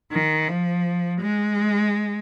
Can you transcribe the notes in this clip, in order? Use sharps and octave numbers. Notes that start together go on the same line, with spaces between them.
D#3
F3
G#3